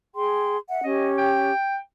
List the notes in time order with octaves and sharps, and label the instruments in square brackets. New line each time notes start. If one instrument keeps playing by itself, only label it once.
[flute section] G#4 G5 C6
E5 F#5
[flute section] C#4 G4 [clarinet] D#5
[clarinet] G5